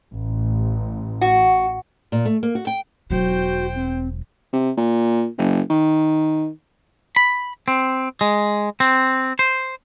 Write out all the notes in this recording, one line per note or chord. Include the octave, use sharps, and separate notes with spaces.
A1
F#4
A#2
A3
A#3
F#4
G5
E1 F#3 F#4 C5 G5
C4
C3
A#2
F#1
D#3
B5
C4
G#3
C4
C5